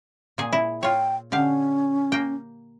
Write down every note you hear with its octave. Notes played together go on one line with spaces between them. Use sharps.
A#2 G#4
E4
F4 C#5 G5
D3 C#4 G4 F5
A#3 G5